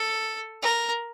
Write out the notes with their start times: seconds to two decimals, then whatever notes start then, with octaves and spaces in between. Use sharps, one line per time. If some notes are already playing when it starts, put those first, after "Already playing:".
Already playing: A4
0.62 A#4